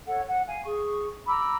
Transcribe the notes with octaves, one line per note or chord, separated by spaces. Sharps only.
A4 C#5 F#5
F#5
F5 G#5
G#4 C#6
A#5 B5 D6 E6